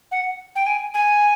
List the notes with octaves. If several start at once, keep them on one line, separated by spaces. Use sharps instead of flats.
F#5
G5
G#5
G#5